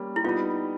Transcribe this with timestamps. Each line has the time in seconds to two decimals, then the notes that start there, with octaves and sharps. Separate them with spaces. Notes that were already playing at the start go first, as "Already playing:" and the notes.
Already playing: G3 A#3 C#4
0.16 E4
0.24 G3 B3 D#4 F4